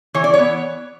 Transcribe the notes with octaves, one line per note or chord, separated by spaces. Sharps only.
E3 C#5
D5
B3 C#5